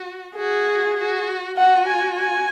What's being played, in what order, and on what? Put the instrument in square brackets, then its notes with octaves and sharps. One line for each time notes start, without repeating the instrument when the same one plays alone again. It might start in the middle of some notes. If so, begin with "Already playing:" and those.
Already playing: [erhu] F#4
[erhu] F#4 [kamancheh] G#4
[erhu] F#4
[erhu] F#4 [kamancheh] F#5
[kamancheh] G#5
G#5